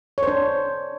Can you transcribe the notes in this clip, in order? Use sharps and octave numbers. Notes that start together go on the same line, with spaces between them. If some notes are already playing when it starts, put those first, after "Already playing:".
D4 C5 C#5